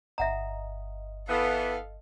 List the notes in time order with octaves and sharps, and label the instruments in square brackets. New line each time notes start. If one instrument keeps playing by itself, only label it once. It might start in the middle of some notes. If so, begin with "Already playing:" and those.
[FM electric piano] G1 D#5 [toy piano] E5 F#5 A#5
[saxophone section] E3 B3 [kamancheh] A4 F5